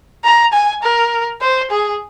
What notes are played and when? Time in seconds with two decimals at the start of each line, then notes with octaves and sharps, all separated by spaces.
0.24 A#5
0.53 G#5
0.83 A#4
1.41 C5
1.70 G#4